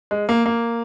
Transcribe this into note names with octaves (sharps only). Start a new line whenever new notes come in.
G#3
A#3
A#3